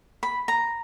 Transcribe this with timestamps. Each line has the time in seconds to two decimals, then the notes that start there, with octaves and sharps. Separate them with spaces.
0.23 B5
0.48 A#5